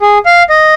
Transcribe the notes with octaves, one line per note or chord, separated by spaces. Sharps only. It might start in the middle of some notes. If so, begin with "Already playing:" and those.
G#4
F5
D#5